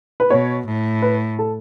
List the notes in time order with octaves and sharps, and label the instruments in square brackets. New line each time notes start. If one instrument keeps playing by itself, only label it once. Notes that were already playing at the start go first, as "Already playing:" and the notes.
[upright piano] B4
[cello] B2 [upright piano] C#5
[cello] A2
[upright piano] B4
A4